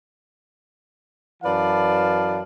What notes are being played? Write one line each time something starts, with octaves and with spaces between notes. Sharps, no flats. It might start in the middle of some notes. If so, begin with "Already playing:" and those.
F#2 E3 B4 D5 F5 A5